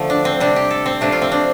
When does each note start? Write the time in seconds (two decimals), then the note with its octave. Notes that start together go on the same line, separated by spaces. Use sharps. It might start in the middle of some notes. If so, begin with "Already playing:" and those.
Already playing: D3 F3 A3
0.10 D4
0.25 C4
0.40 C3 G3 D4
0.56 G4
0.71 A4
0.86 C4
1.01 C3 F3 A3 D4
1.12 F4
1.22 C4
1.32 D4